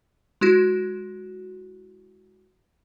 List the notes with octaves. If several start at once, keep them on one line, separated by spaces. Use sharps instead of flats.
G#3 E4 F#4